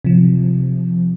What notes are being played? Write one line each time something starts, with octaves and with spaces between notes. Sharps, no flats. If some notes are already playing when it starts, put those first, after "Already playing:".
C3 F3